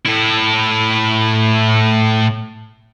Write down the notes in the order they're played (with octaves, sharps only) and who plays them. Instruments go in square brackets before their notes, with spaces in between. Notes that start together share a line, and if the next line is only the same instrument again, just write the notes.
[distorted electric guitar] A2 E4